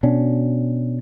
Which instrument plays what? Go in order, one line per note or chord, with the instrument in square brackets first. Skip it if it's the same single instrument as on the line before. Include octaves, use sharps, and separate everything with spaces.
[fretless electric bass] B2 C#4 D4